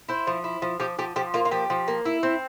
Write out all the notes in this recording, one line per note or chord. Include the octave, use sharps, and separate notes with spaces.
E4 C5
F3
E4
F3
F3 G4
F3 G4
F3 G4
A#3 F4
F4
F3 G4
F3
A#3
E4
C4